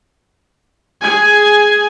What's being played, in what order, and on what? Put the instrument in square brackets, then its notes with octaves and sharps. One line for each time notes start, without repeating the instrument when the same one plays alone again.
[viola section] G#4 G#5